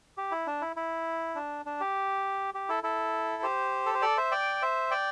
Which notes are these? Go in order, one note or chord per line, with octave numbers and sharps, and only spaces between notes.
G4
E4
D4
E4
E4
D4
D4
G4
G4
E4 A4
E4 A4
G4 C5
A4
C5
A4 D5
C5 E5
D5 G5
C5 E5
D5 G5